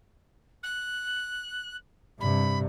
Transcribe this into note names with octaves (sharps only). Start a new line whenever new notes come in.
F#6
G2 C3 B5